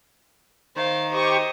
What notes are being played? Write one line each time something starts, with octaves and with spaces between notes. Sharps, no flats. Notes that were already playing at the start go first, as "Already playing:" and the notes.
D#3 C5 F5
G4 C5 D#5 C#6